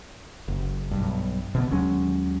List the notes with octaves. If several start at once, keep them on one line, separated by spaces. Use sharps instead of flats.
F#1
B1 G2
B2 D3 B3
D#2 F#3 G#3 C#4